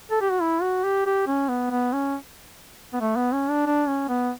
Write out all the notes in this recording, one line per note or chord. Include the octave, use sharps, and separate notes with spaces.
A4
G4
F#4
E4
F#4
G4
G4
C#4
B3
B3
C#4
B3
A3
B3
C#4
D4
D4
C#4
B3